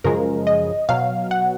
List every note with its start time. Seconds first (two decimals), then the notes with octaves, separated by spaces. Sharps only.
0.04 F#2 C#3 F3 G#3 A#4
0.47 D#5
0.89 B2 F#3 F5
1.31 F#5